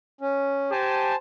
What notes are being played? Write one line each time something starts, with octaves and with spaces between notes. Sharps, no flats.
C#4
G4 C5 G#5 A5